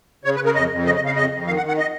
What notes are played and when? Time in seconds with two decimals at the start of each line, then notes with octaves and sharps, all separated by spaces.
0.24 C#3 C#5
0.35 B4
0.40 C#3
0.45 A#4
0.55 F2 D#5
0.71 F2
0.85 C#3 D#5
0.96 D#5
1.01 C#3 F5
1.16 F2 D#5
1.32 F2
1.47 D#3 F5
1.57 F#5
1.62 D#3
1.68 F#5
1.77 D#5